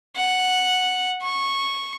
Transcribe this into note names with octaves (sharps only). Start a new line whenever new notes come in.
F#5
C#6